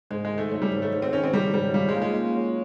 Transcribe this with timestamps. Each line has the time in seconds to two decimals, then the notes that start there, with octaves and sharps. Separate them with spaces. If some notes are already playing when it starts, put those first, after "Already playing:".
0.10 G#2 G#3
0.25 G#3
0.31 D#3
0.38 A3
0.51 F#3 A3
0.62 G3
0.72 G#2
0.82 A3
0.92 G#2
1.02 C4
1.13 D#3 C#4
1.24 C4
1.33 F#3 G3
1.54 G#2 G3
1.74 G3 F4
1.89 G#3
1.95 A#3
2.02 G#3
2.16 C#4
2.36 F#3